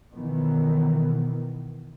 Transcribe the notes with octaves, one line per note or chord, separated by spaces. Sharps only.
B2 D#3 E3 B3